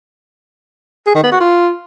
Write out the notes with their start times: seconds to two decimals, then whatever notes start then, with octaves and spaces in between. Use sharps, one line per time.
1.07 G#4
1.15 D#3
1.24 B3
1.32 F#4
1.41 F4